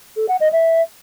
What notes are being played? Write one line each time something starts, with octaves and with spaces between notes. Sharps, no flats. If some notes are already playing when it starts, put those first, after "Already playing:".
A4
F#5
D#5
E5